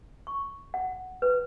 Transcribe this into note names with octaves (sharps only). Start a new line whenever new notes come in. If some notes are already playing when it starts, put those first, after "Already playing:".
C#6
F#5
B4